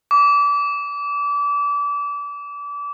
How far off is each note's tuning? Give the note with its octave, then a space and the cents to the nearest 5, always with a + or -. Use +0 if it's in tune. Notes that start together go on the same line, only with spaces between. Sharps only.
D6 -30